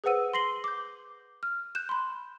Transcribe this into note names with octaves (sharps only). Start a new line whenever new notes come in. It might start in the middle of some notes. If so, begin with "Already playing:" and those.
G#4 B4 C5 F#5 E6 D#7
C6 A#6 C7 F#7 G7
D6 G6
F6
F#6 G6 E7
B5 C6